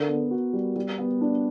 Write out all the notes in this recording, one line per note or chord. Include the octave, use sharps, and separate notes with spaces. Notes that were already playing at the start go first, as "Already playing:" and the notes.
Already playing: D3 A#4
B3
F#4
G3
G3
B3
D4